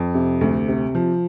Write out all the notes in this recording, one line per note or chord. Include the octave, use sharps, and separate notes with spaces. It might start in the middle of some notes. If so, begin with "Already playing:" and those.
Already playing: F2
C3
D2
C3
F3